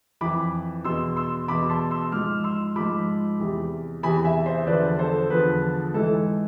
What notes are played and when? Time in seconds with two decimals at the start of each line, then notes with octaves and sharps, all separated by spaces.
0.21 F2 E3 B5 D6
0.84 E2 B2 C6 E6
1.16 C6 E6
1.48 E2 B2 B5 D6
1.69 A5 C6
1.91 C6 E6
2.12 G#2 F3 D6 F6
2.44 C6 E6
2.76 G#2 F3 B5 D6
3.39 E2 C3 E3
4.03 E2 C3 E3 G#5 B5
4.24 E5 G#5
4.45 C5 E5
4.67 E2 D3 F3 B4 D5
4.99 A4 C5
5.30 E2 D3 F3 B4
5.94 G#2 E3 A4